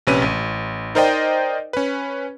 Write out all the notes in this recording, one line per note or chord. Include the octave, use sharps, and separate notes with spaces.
A#1 C3 C#4 B4 D#7
A1
D#4 A#4 C5 D5 D#5 G5
C#4 B4